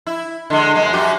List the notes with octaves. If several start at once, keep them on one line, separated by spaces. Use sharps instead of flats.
E4
D3 G#3
F#2 G#3 A#3
F#2 F#4 G4